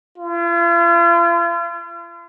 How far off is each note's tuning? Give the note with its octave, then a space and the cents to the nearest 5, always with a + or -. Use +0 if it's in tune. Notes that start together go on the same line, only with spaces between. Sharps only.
F4 -40